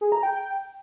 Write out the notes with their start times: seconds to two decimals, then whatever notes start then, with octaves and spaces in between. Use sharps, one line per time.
0.01 G#4
0.12 A#5
0.23 G5